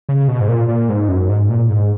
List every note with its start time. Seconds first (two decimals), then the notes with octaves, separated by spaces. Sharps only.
0.09 C#3
0.28 B2
0.40 G#2
0.48 A#2
0.68 A#2
0.89 G#2
1.08 F#2
1.29 G#2
1.50 A#2
1.69 G#2